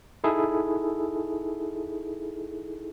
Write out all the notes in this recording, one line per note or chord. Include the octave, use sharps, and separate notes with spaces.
D#4 E4 G#4 A4